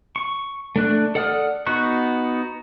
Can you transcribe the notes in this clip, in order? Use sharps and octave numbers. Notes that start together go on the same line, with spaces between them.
C#6
A3 D4 F#6
A4 D5 F#5 D#6 F6
B3 D#4 F#4 C#6 F#6